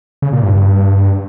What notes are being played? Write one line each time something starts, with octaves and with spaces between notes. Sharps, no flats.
C#3
A#2
G2
G2